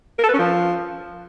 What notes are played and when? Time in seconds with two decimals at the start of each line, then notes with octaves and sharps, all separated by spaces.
0.19 A#4
0.24 A4
0.29 B4
0.34 C#4
0.39 F3